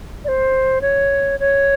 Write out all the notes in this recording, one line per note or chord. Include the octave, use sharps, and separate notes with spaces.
D5
C5
C#5
C#5